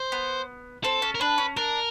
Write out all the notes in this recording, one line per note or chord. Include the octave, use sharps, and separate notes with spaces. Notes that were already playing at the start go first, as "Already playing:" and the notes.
Already playing: C5
B3
C4 A4
C#4
A#4
D4 B4
C#4
D4 A#4